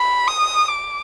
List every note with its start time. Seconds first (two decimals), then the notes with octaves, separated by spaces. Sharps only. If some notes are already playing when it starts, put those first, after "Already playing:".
Already playing: B5
0.28 D#6
0.68 D6